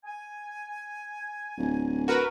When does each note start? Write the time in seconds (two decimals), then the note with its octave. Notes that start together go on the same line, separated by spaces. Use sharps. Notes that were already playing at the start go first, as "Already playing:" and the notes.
0.04 G#5
1.57 D1
2.08 F#4 A#4 B4